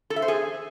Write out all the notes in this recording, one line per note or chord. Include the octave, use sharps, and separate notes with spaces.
A4
E5
C5
G#4